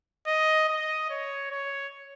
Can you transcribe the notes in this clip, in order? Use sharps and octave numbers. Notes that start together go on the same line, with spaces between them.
D#5
D#5
C#5
C#5